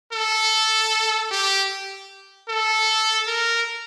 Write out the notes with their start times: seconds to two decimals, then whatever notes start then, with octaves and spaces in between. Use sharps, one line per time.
0.12 A4
1.31 G4
2.48 A4
3.27 A#4